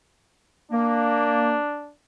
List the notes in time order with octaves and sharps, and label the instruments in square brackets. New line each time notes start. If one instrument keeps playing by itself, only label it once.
[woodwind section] A#3 [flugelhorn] D4